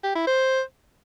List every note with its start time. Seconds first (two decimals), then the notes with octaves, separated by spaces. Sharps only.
0.03 G4
0.15 E4
0.27 C5